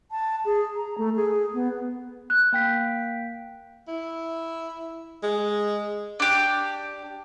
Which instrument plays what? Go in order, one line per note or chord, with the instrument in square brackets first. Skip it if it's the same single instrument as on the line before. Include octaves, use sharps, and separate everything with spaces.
[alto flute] A5
G#4
A#5
A3
G#4
B3
[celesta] F#6
[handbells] A#3 G5 B6
[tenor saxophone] E4
G#3
[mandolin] D4 G4